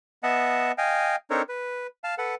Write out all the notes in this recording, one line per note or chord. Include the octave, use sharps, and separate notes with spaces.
B3 D#5 E5 F#5 A5
D#5 F5 G5 G#5
C4 D4 D#4 A4 A#4 C#5
B4
F5 A5
A4 B4 F#5